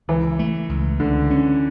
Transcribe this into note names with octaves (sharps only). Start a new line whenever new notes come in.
C#2 E3
A3
C#2
C#2 D3
C#4